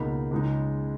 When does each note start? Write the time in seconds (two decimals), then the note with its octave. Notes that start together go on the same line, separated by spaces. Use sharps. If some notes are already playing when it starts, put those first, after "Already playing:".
Already playing: C#2 B2 A#3 D#4 B5
0.31 C#2 C#3 G#3 D#4